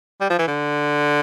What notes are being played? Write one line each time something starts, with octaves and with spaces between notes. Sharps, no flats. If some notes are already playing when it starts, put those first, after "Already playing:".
G3
F3
E3
D3